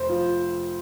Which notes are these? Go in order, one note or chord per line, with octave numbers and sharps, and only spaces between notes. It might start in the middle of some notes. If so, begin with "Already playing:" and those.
Already playing: F1 C5
F3